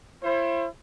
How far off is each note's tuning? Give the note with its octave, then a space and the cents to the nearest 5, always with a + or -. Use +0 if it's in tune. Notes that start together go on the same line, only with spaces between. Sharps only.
E4 +40 C5 +40